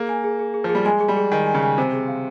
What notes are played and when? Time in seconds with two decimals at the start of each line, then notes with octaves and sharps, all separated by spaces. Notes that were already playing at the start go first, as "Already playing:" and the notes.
Already playing: A#3 G#4
0.09 G#5
0.24 G#4
0.39 G#4
0.54 G#4
0.64 F3
0.69 G#4
0.75 G3
0.85 G#3 G#5
1.00 G#4
1.08 G3
1.17 G#4
1.32 D#3 G#5
1.46 G#5
1.54 C#3
1.63 G#5
1.78 C3 C5
1.93 G#4
2.08 F5